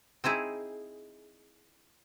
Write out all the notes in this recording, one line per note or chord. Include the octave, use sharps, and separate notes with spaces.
C4 D#4 E4 G#4